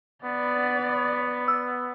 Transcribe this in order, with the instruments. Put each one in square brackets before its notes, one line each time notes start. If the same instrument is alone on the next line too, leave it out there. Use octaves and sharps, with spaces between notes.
[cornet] B3 [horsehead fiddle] D5
[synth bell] E6